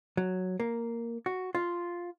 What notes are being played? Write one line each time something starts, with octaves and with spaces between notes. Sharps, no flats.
F#3
A#3
F#4
F4